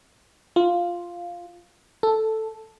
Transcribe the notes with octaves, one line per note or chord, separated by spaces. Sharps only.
F4
A4